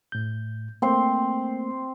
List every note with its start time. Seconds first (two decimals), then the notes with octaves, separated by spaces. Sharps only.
0.12 A2 G6
0.82 A3 A#3 C4 C5